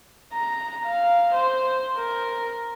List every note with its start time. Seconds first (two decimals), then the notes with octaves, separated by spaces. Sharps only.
0.33 A#5
0.86 F5
1.35 C5
1.98 A#4